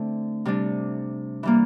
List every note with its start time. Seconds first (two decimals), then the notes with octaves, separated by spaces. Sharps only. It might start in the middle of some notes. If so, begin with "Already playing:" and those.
Already playing: D3 A3 C4
0.45 C3 G3 D4
1.43 E3 G3 A#3